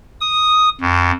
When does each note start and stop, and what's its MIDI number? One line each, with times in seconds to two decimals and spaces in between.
0.21 0.69 87
0.81 1.11 41